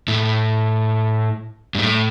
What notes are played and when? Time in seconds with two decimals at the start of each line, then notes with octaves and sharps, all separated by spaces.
0.08 A2
1.75 G2
1.79 A2